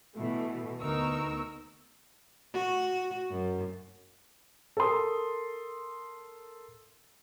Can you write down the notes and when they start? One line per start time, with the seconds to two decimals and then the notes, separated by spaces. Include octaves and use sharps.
0.17 B2 E3 A3
0.82 D2 B3 D#4 A#4 C#6 E6
2.54 F#4
3.31 F#2
4.77 A4 A#4 C6 D#6